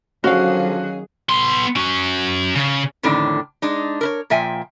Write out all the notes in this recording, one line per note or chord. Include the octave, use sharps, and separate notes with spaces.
D3 D#3 F3 F#3 C#4 F#4 G#4 F5
B3 C6
C#4 F#4
C#3
F2 A2 D3 D#3 C#4 D4
G#3 D4 D#4
A#4 B4 C#5
A#2 F3 E5 G5 G#5